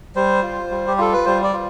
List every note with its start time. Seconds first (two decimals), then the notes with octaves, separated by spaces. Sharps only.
0.15 G3 C5
0.42 F4
0.71 G3
0.88 G4
0.98 F4 A4
1.13 B4
1.25 G3 C5
1.43 D5
1.53 F4